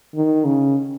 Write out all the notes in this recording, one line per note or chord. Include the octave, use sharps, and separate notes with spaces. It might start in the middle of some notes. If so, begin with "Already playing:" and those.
D#3
C#3